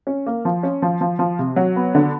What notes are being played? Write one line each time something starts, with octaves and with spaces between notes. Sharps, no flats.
C#4
A#3
F3
C#4
F3
F3
F3
C3
F#3
B3
D3